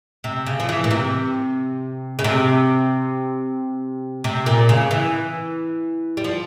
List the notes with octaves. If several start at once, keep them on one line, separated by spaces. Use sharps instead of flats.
C3
C#3
F3
E3
A#2
C3
C#3
C3
C3
A#2
C#3
E3
G3
F3